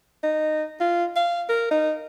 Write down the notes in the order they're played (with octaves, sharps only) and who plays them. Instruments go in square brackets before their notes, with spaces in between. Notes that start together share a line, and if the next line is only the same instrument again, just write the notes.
[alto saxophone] D#4
F4
F5
A#4
D#4